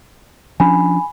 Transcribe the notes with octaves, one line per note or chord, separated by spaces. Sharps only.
F3 C#4 D4 G#5 B5